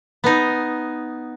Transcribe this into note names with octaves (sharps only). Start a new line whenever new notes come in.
B3 D#4